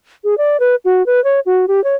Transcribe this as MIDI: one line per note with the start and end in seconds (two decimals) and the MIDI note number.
0.24 0.37 68
0.38 0.57 74
0.60 0.75 71
0.85 1.05 66
1.06 1.23 71
1.24 1.40 73
1.46 1.66 66
1.68 1.83 67
1.84 1.96 73